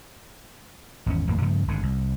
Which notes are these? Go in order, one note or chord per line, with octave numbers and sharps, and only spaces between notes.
G#1 E2 C#4
G#1 F2 A2 A#3
G2 C#3 F3 A3
G#1 G2 D3
C2